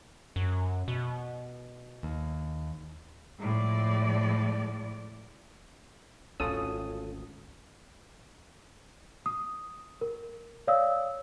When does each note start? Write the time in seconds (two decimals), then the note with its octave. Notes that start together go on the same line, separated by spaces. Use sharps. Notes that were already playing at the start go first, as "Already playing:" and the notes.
0.36 F#2
0.88 B2
2.03 D#2
3.40 A2 F3 G#3 D5
6.40 G#1 D2 C#4 F4 A4 D#6
9.26 D#6
10.01 A#4
10.67 C#5 D5 F5 D#6 E6